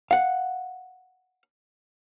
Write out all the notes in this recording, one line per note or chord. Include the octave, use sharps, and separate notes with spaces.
F5 F#5